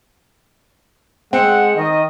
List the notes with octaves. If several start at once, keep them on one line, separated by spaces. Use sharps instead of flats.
G#3 C4 F#5
D#3 D#5